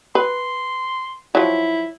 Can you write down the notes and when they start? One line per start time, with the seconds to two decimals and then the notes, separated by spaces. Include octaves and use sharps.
0.15 B4 C6
1.35 F3 F#3 E4